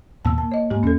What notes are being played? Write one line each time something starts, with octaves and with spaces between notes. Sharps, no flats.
D#2 A#2 B3 A5 E6
A#3 A5
C#5 D#5
G#2 A#3 G4
E2 C#4 A4